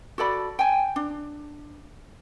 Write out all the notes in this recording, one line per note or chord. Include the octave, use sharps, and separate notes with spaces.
F#4 A4 D5 B5
G5 G#5
D4